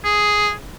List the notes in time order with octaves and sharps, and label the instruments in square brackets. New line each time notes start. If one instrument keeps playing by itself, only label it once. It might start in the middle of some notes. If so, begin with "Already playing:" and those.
[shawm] G#4